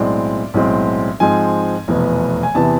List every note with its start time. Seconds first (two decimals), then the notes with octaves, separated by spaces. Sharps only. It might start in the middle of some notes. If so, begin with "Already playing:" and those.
Already playing: B1 A2 G#3 C4 D5
0.54 B1 A2 G#3 C4
1.20 G#2 F3 G#3 C4 G#5
1.88 F1 E2 B2 B3
2.43 G#5
2.55 E2 C3 E3 B3 A5